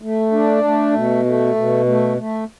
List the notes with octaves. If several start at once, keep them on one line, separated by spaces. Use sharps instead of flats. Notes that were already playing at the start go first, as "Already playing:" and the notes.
A3
D4
A3
B2
A3
B2
A3
A3